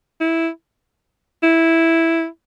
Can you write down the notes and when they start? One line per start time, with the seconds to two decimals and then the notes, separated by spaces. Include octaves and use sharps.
0.20 E4
1.43 E4